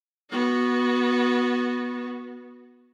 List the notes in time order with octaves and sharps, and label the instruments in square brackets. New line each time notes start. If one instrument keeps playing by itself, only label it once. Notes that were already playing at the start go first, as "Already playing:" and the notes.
[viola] B3 F#4